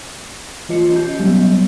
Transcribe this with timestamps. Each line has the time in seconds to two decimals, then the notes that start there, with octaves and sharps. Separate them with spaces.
0.69 E3 F4 D#5 C#7
0.92 C#4 D#5 G6
1.20 F#3 G3 B3 G4